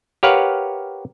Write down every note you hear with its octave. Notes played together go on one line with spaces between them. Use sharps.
G4 A#4 B4 C#5 F5 F#5